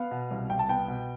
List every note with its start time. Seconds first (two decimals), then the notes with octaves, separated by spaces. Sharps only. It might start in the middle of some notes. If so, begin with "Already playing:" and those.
Already playing: B3 F5
0.11 B2
0.31 C2
0.49 C2 G5
0.59 A5
0.68 B3 G5
0.88 B2